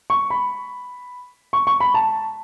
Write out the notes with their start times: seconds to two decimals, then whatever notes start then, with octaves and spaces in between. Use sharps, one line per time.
0.10 C#6
0.30 B5
1.53 C#6
1.67 C#6
1.80 B5
1.94 A5